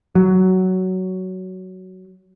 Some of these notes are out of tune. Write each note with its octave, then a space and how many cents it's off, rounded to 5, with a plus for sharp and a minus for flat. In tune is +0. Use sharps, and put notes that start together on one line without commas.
F#3 +10